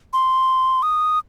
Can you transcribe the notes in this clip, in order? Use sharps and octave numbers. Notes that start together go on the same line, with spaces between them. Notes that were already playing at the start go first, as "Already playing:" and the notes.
C6
D#6